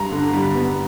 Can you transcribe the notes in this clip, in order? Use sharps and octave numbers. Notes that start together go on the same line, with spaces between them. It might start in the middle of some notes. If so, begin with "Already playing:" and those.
Already playing: G2 A#5
D3
G3
B3